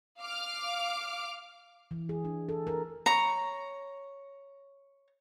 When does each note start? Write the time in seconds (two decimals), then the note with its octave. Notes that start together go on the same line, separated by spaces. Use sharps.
0.20 F5 D6 F6
1.91 E3
2.09 G#4
2.25 D4
2.49 A4
2.67 A#4
3.06 C#5 A#5